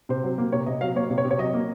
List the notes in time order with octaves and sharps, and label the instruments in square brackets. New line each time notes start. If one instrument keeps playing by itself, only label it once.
[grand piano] C3 C5
F#3
A#3
C3 C#5
C3 D#5
F#3 F5
A#3 C#5
C3
C#5
C3
C#5
F#3 D#5
A#3